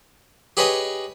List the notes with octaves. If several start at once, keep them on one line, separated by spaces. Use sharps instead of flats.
G4 G#4 B4 C#5 D#5 G#5